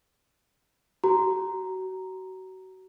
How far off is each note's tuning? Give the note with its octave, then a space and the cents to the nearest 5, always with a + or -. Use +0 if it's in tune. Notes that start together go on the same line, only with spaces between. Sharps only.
F#4 +30 A#5 +0